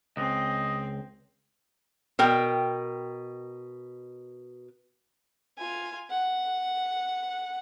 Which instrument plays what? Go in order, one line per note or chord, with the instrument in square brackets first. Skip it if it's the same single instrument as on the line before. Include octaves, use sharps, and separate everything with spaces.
[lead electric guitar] C#2 [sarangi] C4 [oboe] D#5
[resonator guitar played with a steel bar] B2 A#4 G5
[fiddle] F4 G#5
F#5